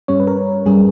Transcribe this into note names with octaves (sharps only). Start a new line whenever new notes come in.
G2 G3 C#4 C#5
B4
A#4
G2 G3 C#4 G#4